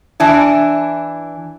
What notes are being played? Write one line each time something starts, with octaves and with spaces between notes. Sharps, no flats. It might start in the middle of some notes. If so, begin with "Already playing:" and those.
E3 D4 E4